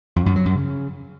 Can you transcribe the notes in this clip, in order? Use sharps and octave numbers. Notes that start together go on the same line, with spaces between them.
F2
F#2
F#3
F#2
C#3